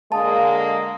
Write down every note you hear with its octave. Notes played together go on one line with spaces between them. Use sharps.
D3 G#3 A#3 F5 A5 D#6